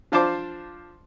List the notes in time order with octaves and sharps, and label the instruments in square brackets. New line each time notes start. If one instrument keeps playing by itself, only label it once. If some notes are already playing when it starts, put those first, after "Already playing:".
[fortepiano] F3 D4 F4 C5 A5 D6